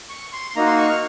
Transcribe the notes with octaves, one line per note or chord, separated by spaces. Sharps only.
C#6
C6
C6
A#3 D#4 F#4 A#5
C6
C#6
F6